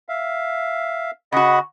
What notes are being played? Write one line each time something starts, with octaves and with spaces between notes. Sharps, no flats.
E5 F5
C#3 F#4 D#5 F#5 B5